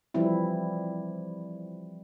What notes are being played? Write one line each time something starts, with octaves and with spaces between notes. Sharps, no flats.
E3 F3 G3 C4 E4